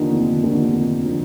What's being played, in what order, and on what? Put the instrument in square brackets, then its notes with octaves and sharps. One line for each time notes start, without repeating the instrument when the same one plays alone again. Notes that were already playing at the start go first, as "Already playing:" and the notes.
Already playing: [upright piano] D#2 D3 F3 D#4
F1
D#2 D3 F3
F1
D3 F3